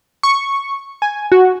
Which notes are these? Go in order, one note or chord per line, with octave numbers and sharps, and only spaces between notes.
C#6
G#5
F#4